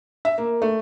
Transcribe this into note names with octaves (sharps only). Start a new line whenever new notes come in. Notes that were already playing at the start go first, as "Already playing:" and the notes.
E5
A#3
A3